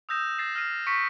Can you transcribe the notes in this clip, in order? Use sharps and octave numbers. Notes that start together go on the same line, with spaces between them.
D#6 E6 G6 A#6 E7
A6 A#6 C7 E7
F6 A#6 C7 D#7
C#6 B6 C#7